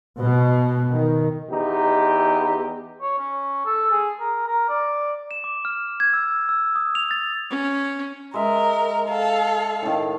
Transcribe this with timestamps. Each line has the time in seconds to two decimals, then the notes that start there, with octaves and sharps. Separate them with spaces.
0.21 B2
0.92 D#3
1.49 E2 D#4 G4
3.01 C#5
3.19 C#4
3.65 A4
3.91 G#4
4.20 A#4
4.47 A#4
4.69 D5
5.31 E7
5.44 D6
5.65 F6
6.00 G#6
6.13 E6
6.49 E6
6.76 D#6
6.95 F7
7.11 A6
7.50 C#4
8.34 G#3 A#4 E5
9.10 A4 F5
9.82 A2 D#3